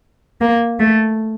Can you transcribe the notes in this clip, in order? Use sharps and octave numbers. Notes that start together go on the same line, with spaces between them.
A#3
A3